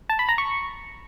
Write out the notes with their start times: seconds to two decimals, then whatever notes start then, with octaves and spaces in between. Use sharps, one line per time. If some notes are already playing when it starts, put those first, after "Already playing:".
0.10 A5
0.19 B5
0.29 A#5
0.38 C#6